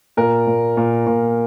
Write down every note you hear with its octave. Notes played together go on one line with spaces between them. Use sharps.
A#2 A#4
A#2
A#2
A#2